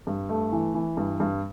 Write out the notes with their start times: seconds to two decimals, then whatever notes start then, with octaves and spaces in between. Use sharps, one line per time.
0.07 G2
0.29 A3
0.52 E3
0.74 E3
0.97 G2
1.20 G2